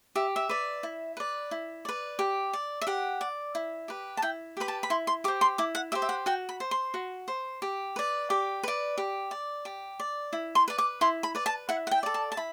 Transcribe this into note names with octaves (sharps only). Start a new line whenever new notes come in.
G4 E5
E5
B4 D5
E4
B4 D5
E4
B4 D5
G4
D5
E5
G4 F#5
D5
E4
G4 B4
A5
E4 G5
G4 B4 B5
A5
B5
E4 C6
C6
G4 C5 D6
C6
E4 D6
F#5
G4 C5 E5
E5
F#5
F#4 G5
B5
C5
C6
F#4
C5
G4
B4 D5
G4 D6
B4 D5
G4
D5
G4
D5
E4
C6
B4 D5
D6
E4 C6
B5
B4 D5
A5
E4 F#5
F#5
G5
A4 D5
A5
A5
E4 B5